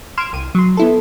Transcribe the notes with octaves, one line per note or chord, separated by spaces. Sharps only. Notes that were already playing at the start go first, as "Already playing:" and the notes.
C6 F6 G#6 D7 E7
C2 D#7
F#3 C6
B3 E4 A4